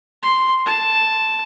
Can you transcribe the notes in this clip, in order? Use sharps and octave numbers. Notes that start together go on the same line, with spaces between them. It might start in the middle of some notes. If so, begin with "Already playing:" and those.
C6
A5